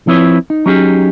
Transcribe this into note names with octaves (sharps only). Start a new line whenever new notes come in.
F3 C4 E4 B4 C#5
D#4
F#3 C#4 D#4 G4 G#4